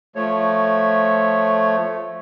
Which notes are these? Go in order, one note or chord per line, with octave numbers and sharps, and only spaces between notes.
F3 A3 C#5